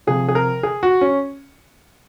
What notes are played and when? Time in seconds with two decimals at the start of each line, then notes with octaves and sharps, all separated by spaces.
0.07 C3 F3 G#4
0.29 G#4
0.35 A#4
0.63 G#4
0.83 F#4
1.01 C#4